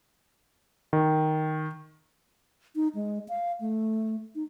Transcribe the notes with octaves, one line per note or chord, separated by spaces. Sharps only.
D#3
D#4
G#3
F5
A3
D#4